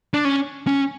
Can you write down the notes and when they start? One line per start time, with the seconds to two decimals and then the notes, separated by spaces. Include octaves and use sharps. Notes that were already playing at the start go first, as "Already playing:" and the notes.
0.14 D4
0.25 C#4
0.67 C#4